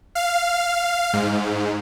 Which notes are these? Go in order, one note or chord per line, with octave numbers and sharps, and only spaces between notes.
F5
G#2